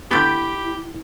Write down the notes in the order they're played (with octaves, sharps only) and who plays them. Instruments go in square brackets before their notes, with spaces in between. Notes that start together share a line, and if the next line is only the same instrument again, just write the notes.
[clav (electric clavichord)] D3 A3 B3 [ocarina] E4 [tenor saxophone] G4 [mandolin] G5 B5